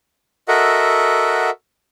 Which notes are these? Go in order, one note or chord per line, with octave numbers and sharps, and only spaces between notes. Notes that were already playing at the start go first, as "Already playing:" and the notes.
F#4 A4 A#4 D#5 E5 F#5